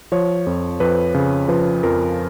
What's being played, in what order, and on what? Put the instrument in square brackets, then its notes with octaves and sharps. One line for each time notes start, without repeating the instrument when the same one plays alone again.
[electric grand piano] F3 C#5
F2
F2 B4
C#3
F3 B4
F2 A#4